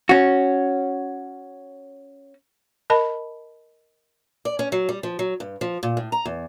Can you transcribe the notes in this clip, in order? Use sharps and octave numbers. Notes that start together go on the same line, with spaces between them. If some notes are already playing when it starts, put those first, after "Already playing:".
C#4 F#4
A#4 D#5 A5 B5
D5
C#4
F#3
G3
F3
F#3
G2
F3
A#2
A2
A#5
E2